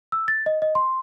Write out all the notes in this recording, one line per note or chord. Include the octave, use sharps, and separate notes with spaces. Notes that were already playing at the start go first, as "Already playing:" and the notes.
E6
A6
D#5
D#5
C6